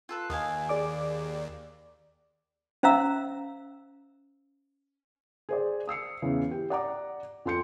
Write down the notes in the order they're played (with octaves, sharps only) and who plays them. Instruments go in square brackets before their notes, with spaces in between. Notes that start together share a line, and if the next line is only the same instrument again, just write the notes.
[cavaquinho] F4 A4 B4
[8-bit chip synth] D#2 [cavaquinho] D#5 F5 G#5
[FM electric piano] G#4 D5 D6
[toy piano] C#4 C5 E5 F5 A#5 E6
[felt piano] G#4 C5 D5
D#6 E6 C7 C#7
E2 C#3 E3
G4
D5 F#5 A#5 D6
F2 A4 C6 G6 C#7